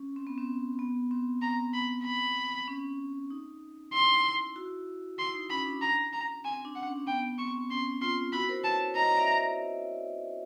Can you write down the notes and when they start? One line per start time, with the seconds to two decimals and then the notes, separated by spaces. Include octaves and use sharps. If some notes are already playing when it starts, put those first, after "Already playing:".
Already playing: C#4
0.16 C4
0.27 B3
0.38 C4
0.79 B3
1.11 C4
1.42 A#5
1.74 B5
2.04 B5
2.68 C#4
3.30 D#4
3.93 E4 C6
4.56 E4 F#4
5.19 E4 C6
5.35 D#4
5.50 C#4 B5
5.66 D4
5.82 A#5
6.13 A#5
6.45 C4 G#5
6.65 D4
6.76 F#5
6.86 C#4
7.07 B3 G5
7.39 C4 C#6
7.70 C#4 C6
8.02 F4 C6
8.33 E4 F#4 B5
8.49 A#4 C5
8.64 B4 C#5 A5
8.95 C#5 D#5 A#5
9.17 D5 E5